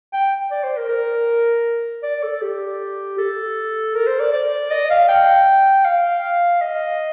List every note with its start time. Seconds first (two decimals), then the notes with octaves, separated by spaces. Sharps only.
0.13 G5
0.51 D5
0.64 C5
0.77 A#4
0.89 A#4
2.03 D5
2.23 A4
2.42 G4
3.18 A4
3.95 A#4
4.07 C5
4.20 D5
4.32 D5
4.71 D#5
4.90 F5
5.09 G5
5.85 F5
6.61 D#5